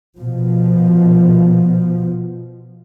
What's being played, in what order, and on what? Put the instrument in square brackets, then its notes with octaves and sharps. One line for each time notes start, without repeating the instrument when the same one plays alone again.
[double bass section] B2 F3